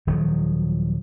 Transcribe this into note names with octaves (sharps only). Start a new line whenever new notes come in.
D#1 D#3 F3 F#3